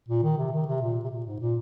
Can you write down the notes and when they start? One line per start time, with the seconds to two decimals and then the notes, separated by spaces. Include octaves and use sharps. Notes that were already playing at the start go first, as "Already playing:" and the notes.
0.08 A#2
0.23 D#3
0.38 C3
0.52 D#3
0.67 C3
0.82 A#2
1.04 C3
1.11 A#2
1.25 G#2
1.40 A#2